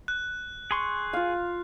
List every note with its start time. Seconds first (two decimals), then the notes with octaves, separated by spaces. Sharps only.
0.08 F#6
0.71 G#4 C6 C#6
1.13 F4 F5